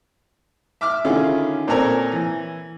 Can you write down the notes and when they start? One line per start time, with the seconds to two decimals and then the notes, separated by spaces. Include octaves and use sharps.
0.81 E5 D6 E6 F6
1.05 D3 D#3 C#4 E4 F4 G#4
1.68 A#2 C4 A4 A#4 C#5 A#5
2.12 E3